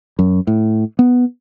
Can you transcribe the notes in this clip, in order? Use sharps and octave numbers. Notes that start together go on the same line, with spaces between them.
F#2
A2
B3